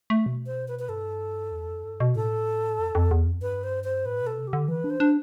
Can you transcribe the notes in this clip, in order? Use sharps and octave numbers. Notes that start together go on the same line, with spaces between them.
A3
B2
C5
B4
B4
G2 A4
E2
F2
G2
B2
A2 A4
F2
F2
E2
F2
G2 B4
C5
C5
A2 B4
B2
A4
C3
G4
D3
E3 B4
D4
C5
D4